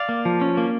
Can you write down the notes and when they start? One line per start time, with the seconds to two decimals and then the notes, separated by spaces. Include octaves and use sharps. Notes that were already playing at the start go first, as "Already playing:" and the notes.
Already playing: D5 F5
0.09 A#3
0.25 F3
0.41 C#4
0.57 A#3